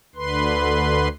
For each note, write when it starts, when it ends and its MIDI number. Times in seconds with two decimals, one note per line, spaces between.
0.16 1.08 38
0.16 1.08 50
0.16 1.08 71
0.16 1.08 84